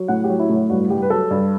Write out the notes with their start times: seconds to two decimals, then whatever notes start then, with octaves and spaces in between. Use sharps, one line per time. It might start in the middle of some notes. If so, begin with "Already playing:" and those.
Already playing: F#3
0.08 A2 F#5
0.24 G4
0.29 F#3
0.40 E4
0.49 A2
0.55 F#4
0.70 G2 F#4
0.90 G2 G4
1.02 B4
1.10 F#3 A4
1.31 G2